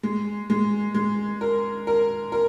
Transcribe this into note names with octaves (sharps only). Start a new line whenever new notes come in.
G#3
G#3
G#3
A#4
A#4
A#4